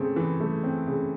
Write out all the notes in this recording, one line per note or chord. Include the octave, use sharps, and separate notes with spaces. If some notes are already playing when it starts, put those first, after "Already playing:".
Already playing: C#3 A3 C4
E3
A3
C4
C#3